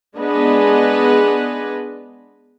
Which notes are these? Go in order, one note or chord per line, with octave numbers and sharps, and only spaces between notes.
G#3 B3 D4 G#4 B4 D#5